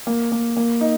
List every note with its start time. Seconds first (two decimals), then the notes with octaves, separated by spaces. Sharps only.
0.07 A#3
0.32 A#3
0.57 A#3
0.81 D#4